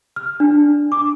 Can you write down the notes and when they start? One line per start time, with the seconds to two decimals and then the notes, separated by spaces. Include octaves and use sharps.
0.16 F6
0.40 D4
0.92 D6